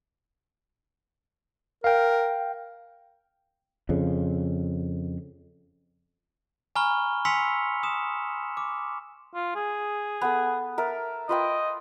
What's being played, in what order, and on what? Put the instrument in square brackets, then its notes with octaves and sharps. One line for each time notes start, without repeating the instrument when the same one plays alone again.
[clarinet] A#4 [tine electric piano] F5 G5
[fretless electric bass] F2 C#3
[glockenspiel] G#5 A#5 B5 C#6 F6 G7
G#5 C6 E6 B6 C#7 F7
D#6 E7
D6
[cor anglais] F4
G#4
[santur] B3 A4
A#4 E5 A5
[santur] F4 B4 G5 [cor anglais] D#5